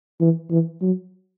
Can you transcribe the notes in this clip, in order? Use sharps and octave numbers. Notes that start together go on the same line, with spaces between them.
E3
E3
F#3